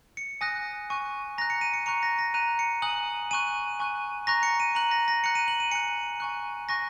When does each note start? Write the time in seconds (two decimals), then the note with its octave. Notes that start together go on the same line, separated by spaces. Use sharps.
0.17 C#7
0.41 G#5 D#6 F#6 A#6
0.90 G#5 C#6 F#6
1.38 A#5 F#6 A#6
1.50 C#7
1.61 D#7
1.73 C#7
1.86 A#5 C#6 F#6 C#7
2.03 A#6
2.19 A#6
2.34 A#5 F#6 D#7
2.59 C#7
2.82 G#5 D#6 F#6 F#7
3.31 G#5 C#6 F#6 D#7
3.80 G#5 C#6 F#6
4.27 A#5 C#6 F#6 A#6
4.43 C#7
4.60 D#7
4.75 A#5 F#6 F#7
4.91 A#6
5.08 A#6
5.24 A#5 F#6 C#7
5.35 D#7
5.48 F#7
5.60 D#7
5.71 G#5 F#6 C#7
6.20 G#5 C#6 F#6
6.69 G#5 C#6 F#6 A#6